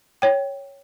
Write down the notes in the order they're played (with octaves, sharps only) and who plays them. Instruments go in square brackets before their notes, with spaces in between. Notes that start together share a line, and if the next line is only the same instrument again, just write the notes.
[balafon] C#5 G5